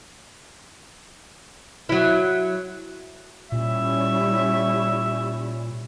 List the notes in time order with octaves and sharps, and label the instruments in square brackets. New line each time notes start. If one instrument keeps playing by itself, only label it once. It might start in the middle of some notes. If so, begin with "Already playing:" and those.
[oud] F#3 E4
[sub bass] A#2 [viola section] G3 C#4 E4 [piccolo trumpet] E5